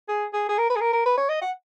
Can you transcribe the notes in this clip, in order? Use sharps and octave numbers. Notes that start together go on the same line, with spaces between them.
G#4
G#4
G#4
A#4
B4
G#4
A#4
A#4
B4
C#5
D#5
F#5